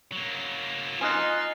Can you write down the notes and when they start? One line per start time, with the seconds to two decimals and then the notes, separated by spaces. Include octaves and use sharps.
0.12 F#3 A#3
1.01 D#4 F4 G#5 D#6 F#6